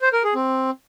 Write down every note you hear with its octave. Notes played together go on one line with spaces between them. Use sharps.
C5
A#4
G#4
C4